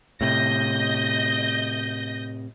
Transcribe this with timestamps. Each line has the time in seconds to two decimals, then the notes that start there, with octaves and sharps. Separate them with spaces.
0.21 A2 C3 D#5 G6 A#6